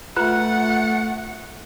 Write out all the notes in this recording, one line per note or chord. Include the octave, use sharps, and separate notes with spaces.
A3 F4 B4 F#5 A#5 F#6